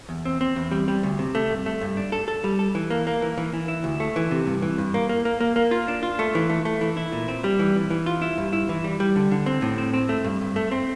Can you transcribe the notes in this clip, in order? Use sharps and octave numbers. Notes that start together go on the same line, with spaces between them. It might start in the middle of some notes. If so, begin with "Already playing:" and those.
E2
C4
C4
E2
G3
G3
D2
C3
A3
G2
A3
G2
D4
A4
A4
G3
A4
E3
A#3
A#3
E3
E3
E3
E4
D2
A3
E3
C3
G2
E3
G2
A#3
A#3
A#3
A#3
A#3
F4
D4
F4
A3
E3
A3
A3
E3
E4
A#2
C4
G3
E3
E3
E3
F4
E4
G2
E4
E3
G3
G3
D3
D3
C4
A2
C4
C4
A3
G2
G2
A3
C4